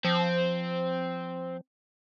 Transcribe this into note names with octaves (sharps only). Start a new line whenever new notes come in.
F3 C4